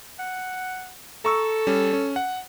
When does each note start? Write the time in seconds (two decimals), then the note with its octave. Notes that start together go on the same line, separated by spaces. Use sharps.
0.19 F#5
1.25 A4 A#5 C#6 E6
1.67 G3 C#4
1.93 C#4
2.16 F#5